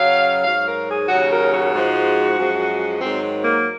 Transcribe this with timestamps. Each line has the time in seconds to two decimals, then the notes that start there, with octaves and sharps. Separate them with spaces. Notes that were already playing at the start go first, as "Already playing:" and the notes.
Already playing: F#2 C#3 F#3 F5
0.44 G#2 F#3 F5
0.66 A#4
0.87 G#4
1.08 D#2 C#3 F#3 F#4
1.30 A#4
1.51 F#4
1.72 G#2 F3 G#3
2.37 F#2 F3 G#3
3.01 G#2 D#3 F#3 C4
3.43 A#3